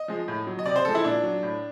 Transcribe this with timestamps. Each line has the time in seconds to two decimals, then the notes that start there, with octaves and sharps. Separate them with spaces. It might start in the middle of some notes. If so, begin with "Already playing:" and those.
Already playing: D#5
0.08 F3 G#3
0.28 A2
0.47 F#3
0.59 D#5
0.66 C3 D5
0.76 C5
0.85 F3 G#3 A4
0.95 E4
1.04 A#2 D4
1.24 F#3
1.43 A2